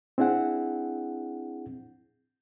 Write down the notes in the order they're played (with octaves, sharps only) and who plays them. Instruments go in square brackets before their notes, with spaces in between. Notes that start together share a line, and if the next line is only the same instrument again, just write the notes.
[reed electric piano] C4 D4 E4 G#4 F#5